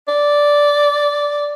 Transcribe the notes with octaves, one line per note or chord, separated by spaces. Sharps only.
D5